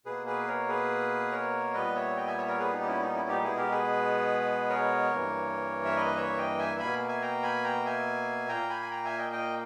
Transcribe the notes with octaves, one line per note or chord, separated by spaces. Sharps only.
B2 A#3 G#4 B4
G#4 B4
A#4 C#5
G#4 B4
A#4 C#5
A#2 G3 B3 B4 D#5
C#5 E5
D#5 G5
E5 G#5
C#5 E5
A#4 C#5
G#4 B4
D#4
G4
C#4 E4
D#4
C#4 E4
D#4 G4
B2 G#3 B3 E4 G#4
G4 A#4
G#4 B4
A#4 C#5
G2 E3 A#3
E5
B4 D#5
C#5 E5
D#5 G5
E5 G#5
B2 A#3 G#5 B5
E5 G#5
G5 A#5
G#5 B5
G5 A#5
E5 G#5
A#2 A#3 G5 A#5
G#5 B5
G#5
G5 A#5
E5 G#5
D#5 G5
D#5 G5